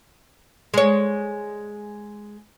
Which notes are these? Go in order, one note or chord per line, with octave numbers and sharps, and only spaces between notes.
G#3 C#5